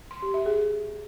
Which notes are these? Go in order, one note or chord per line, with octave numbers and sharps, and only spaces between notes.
C6
G4
E5
G#4